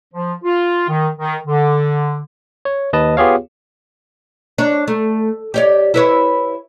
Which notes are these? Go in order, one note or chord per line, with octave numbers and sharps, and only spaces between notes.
F3
F4
D#3
D#3
D3
C#5
D#2 B4 D#5 A5
B3 F4 G4 G#4 C#5 F5
D4 C#5
A3
G4 C#5 D5
E4 B4 C#5